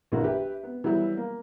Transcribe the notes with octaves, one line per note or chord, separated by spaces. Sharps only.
A#1 D3 E3 A#3 F#4
G4 B4 E5
B3
E3 F#3 G3 E4
A#3